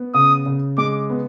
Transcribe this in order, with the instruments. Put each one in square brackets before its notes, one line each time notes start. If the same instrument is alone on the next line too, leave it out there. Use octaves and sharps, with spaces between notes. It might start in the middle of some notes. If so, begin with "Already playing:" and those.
Already playing: [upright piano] B3
[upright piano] C#3 [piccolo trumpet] D#6
[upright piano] C#3
[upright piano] G#3 [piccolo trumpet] D6
[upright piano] B3